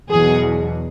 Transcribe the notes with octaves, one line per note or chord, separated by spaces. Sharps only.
E2 B2 F#3 G#4